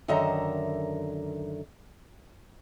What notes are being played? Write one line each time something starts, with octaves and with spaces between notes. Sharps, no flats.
F#2 D3 D#3 D#5 E5 A#5